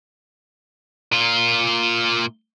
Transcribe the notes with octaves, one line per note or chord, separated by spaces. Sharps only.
A#2 F4